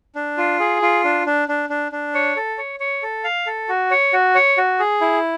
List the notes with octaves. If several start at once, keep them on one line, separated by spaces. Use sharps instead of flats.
D4
F4
G#4
F4
D4
D4
D4
D4
D4
C#5
A4
C#5
C#5
A4
F5
A4
F#4
C#5
F#4
C#5
F#4
G#4
E4